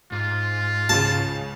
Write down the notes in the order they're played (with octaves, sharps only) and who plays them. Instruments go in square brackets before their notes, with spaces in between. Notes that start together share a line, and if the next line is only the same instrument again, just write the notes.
[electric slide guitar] G#2 [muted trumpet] F4
[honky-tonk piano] C#2 C#3 [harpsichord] A5